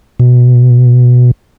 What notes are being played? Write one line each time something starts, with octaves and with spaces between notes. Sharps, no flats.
B2